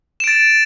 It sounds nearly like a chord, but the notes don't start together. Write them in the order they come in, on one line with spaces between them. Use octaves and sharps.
E7 D7 A6